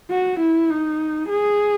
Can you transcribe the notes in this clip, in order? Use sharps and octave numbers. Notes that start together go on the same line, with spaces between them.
F#4
E4
D#4
G#4